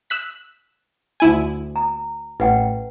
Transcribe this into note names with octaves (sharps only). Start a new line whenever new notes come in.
E6 F#6 B6
D2 E4 G#5
A#5
A1 B4 F#5 G5